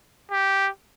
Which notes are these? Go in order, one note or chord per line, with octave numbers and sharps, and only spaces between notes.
G4